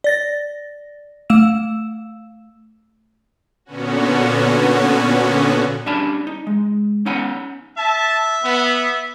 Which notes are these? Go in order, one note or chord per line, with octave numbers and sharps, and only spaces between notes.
D5 A6 A#6
A3 F5 E6 E7
A#2 D3 B3 C#4 F#4
G3 C#4 D4 G#5 A5 B5
D#4
G#3
B3 C#4 D#4 F#5 G#5 B5
E5 A5
B3